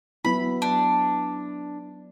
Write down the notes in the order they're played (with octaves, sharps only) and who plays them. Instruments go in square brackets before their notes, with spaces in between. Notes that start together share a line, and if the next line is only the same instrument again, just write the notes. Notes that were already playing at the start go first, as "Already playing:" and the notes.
[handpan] F#3 B3 E4 [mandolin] B5
[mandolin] D4